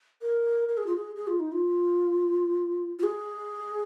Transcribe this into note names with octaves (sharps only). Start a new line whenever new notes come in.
A#4
A#4
G#4
F4
G#4
G#4
F4
D#4
F4
F4
G#4